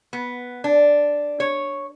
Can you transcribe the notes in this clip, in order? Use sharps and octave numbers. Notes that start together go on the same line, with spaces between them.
B3
D4
C#5